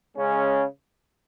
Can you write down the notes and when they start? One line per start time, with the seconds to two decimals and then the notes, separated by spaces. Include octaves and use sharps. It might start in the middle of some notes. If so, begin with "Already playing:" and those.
0.16 C#3 G#3 C#4